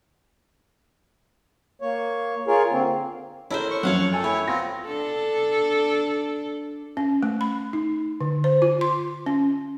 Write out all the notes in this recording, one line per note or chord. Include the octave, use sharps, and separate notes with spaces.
A#3 C#5
F4 G#4 A#4 C#5
D3 A#3 C4
E4 A4 A#4 C5 C#5
C#6
F#2 F3 C#5 F5 F#5
A4 G5 G#5
A3 E4 C#5
B3 C4 F4 A#6
D4 A4
C#4
A3
B5
D#4
D3
C5
F4
C6
C#4